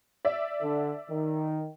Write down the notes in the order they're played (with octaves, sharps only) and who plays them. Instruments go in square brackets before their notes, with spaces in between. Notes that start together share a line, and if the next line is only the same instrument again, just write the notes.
[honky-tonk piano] D5 E5
[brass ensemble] D3
D#3